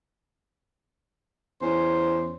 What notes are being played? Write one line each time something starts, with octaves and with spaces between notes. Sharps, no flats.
E2 C#4 C5